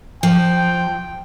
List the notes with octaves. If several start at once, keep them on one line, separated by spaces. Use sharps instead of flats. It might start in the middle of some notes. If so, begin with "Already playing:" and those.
F3 G5